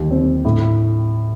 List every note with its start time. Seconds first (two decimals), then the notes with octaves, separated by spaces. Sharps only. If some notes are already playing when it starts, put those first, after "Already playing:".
Already playing: D#2
0.11 C4
0.45 A2